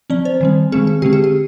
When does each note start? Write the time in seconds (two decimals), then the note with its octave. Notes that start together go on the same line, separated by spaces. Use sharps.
0.10 F3 C4 D5
0.25 C5
0.41 D#3 G3 C4
0.72 D#3 G#3 C4 G#4
0.87 G#4
1.02 D3 G#3 C4 G4
1.13 G#4
1.24 G4